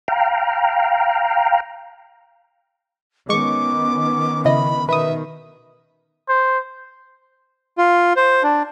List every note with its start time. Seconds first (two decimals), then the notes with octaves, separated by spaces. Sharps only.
0.08 F5 G5 A#5
3.29 D#3 G#3 B3 C#4 C#6 D6
4.45 C#3 E4 D#5 B5
4.89 B2 D#3 B4 E5 D#6
6.29 C5
7.78 F4
8.16 C5
8.43 D4